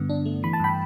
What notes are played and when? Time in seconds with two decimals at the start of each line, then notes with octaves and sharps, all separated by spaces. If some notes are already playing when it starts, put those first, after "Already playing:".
Already playing: G2 D3 B3
0.09 D4
0.25 A3
0.43 E3 B5
0.53 A5
0.60 G2 G5 B5